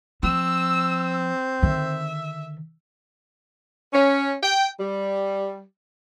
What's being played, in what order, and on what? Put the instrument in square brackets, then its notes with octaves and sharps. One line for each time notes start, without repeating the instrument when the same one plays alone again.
[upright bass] F3 [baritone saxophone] C4 [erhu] E6
[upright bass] D3 D#3 [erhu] E5
[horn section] C#4
G5
G3